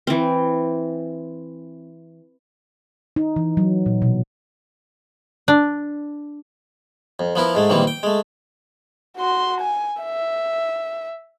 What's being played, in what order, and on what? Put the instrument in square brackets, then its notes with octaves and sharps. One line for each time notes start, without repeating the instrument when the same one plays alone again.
[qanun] E3 C4
[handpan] D#4
E3
F#3
A#2
B2
[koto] D4
[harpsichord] F2
F3 B3 E4 A#4
G#2 G#3 A3
A#1 D#3 E3 G3 A#3 C4
G5
G#3 A3
[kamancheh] F#4 C6
G#5
E5